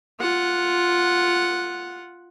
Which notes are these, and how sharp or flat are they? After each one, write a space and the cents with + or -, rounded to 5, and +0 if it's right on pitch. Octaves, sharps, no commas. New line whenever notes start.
F4 +0 F#5 -5